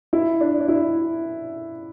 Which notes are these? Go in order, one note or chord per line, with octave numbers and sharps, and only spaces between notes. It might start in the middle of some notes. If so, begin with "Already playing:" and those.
E4
D4
D4
E4